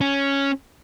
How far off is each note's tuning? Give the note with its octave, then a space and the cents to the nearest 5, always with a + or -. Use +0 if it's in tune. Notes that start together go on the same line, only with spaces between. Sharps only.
C#4 +0